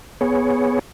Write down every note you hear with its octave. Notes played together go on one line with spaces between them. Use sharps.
B3 G#4 C#5